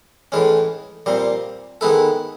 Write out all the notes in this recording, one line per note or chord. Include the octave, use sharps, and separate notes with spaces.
A2 E3 G#3 C#4
A#2 G3 C4
D#3 G#3 B3 E4 A4